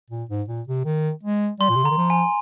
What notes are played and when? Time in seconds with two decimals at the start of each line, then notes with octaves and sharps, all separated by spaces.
0.11 A#2
0.29 G#2
0.48 A#2
0.68 C3
0.85 D#3
1.23 G#3
1.60 G3 C6
1.70 A#2
1.76 C3
1.84 D3 A#5
1.91 D#3
1.97 F3
2.10 G#5